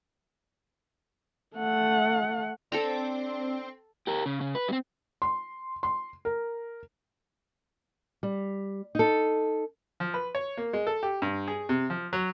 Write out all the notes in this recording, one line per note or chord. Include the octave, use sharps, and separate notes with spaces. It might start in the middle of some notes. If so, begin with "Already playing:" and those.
A3 F#5
C4 D4 A4 G5 A#5
G4 A#4
C#3
C#3
B4
G3 C4
C6
C6
A#4
G3
D#4 A4
F3
B4
C#5
A#3
G#3
A4
G4
G2
G#4
C3
F3
F#3